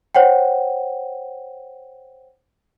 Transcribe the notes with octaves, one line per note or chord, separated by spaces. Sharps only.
C5 C#5 F#5 G5